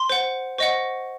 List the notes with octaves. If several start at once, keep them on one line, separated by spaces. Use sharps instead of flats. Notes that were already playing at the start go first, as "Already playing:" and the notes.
Already playing: C6
C5 F#5
C5 D#5 F#5 C#6